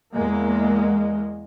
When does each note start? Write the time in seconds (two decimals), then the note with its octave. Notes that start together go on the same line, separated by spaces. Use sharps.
0.13 E2 G#3 A#3